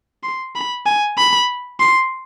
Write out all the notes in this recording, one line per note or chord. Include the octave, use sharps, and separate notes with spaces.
C6
B5
G#5
B5
C6